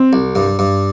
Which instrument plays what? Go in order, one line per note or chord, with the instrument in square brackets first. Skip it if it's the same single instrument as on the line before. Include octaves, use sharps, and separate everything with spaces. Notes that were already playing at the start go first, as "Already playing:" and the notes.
Already playing: [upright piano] C4
[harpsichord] C2
G2
G2